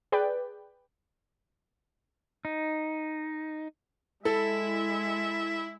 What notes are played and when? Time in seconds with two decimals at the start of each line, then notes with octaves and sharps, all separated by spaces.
0.12 G#4 B4 D5 G5
2.45 D#4
4.25 G#3 E4 A4 E5